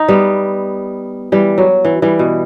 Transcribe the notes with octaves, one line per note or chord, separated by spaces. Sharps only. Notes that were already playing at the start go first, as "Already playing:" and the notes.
Already playing: D#4
G3 B3
E3 G3
F#3
E3
E3 G3
B2